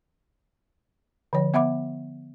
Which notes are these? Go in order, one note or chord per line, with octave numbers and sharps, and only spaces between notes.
D3 F3 C#5
B3 E5 F#5 B5 D6